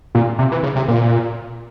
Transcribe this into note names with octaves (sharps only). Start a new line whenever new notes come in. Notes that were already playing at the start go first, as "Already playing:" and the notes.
A#2
C3
E3
C#3
C3
A#2